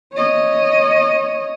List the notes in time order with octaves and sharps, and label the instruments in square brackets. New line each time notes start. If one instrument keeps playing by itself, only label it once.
[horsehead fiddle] C#5 D#5